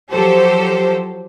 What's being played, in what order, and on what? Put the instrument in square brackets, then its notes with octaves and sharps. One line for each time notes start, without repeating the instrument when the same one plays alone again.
[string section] F3 F#3 G4 A4 C5